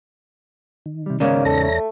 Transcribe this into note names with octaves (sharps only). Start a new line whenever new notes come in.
D#3
C3 G3
G#2 C#3 A#3 C#5 D5
E2 A4 A#5 A#6
A3